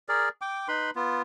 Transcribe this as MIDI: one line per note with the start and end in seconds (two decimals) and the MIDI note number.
0.09 0.29 68
0.09 0.29 70
0.09 0.29 74
0.41 0.68 79
0.41 0.68 86
0.68 0.91 63
0.68 0.91 71
0.68 0.91 83
0.68 0.91 84
0.96 1.22 59
0.96 1.22 65